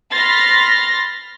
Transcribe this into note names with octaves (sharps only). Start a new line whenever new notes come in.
B5 C6 F6 A6 A#6